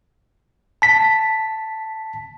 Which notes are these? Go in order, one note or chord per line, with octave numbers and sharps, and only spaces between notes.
A5 B6